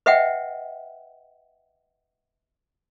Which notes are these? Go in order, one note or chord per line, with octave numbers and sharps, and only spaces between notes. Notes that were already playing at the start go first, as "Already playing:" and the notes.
B4 D#5 E5 F#5 G5